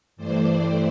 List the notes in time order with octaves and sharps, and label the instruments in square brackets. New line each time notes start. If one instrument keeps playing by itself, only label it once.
[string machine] G2 E3 A3 C5 D5